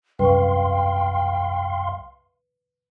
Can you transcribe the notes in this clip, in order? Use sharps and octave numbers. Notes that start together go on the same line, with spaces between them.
C2 F#2 B4 F5 G5 C6 C#6